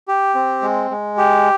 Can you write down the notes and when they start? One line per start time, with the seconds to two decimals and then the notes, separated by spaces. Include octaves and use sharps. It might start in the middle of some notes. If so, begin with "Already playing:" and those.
0.08 G4
0.35 C4
0.62 G#3
0.91 G#3
1.17 G4